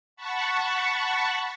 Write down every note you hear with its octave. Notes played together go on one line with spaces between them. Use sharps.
F#5 A5 B5 C#6